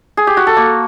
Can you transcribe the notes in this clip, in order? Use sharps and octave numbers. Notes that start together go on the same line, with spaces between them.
G#4
G4
F#4
A4
A#3